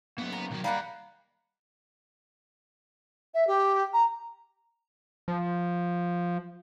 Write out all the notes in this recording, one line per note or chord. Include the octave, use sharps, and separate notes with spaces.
F#3 A#3 B3
A#5
B1 D#3 F#3
D#2 G3 A#3 D#5 F5 F#5 A#5
E5
G4
A#5
F3